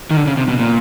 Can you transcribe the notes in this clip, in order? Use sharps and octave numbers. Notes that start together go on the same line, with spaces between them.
D#3
D3
C#3
C3
B2
A#2